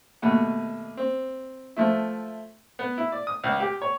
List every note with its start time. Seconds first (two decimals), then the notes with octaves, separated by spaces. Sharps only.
0.22 D#2 B2 A3 F#5
0.97 C4
1.76 F3 A3 E4
2.79 B3
2.98 E4
3.12 D5
3.27 D#6
3.44 C#2
3.60 G4
3.82 C#5